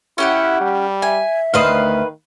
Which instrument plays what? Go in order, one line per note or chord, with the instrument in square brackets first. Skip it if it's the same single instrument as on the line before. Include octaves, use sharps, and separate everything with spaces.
[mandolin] C#4 G4 F#5 [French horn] E4
[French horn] G3
[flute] E5 [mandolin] G#5
[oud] D2 C5 D#5 [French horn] D#3 [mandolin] B4 F5